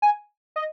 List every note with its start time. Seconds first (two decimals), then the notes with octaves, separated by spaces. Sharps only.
0.02 G#5
0.56 D#5